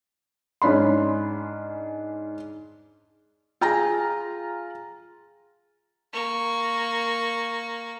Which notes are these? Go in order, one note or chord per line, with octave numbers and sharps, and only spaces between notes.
G#2 C#4 D4 B5 C6
F4 G#4 G5 A#5 A#6
A#3 C#6